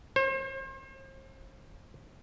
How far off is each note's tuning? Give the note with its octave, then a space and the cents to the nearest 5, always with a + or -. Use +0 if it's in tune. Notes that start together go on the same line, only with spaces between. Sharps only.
C5 +40